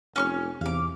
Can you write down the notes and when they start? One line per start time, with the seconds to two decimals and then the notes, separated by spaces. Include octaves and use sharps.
0.16 F1 C#4 C#6 F6
0.61 E2 C3 F5 D6